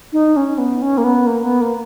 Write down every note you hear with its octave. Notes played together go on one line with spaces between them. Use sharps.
D#4
C#4
B3
C#4
A#3
B3
A#3
B3
A#3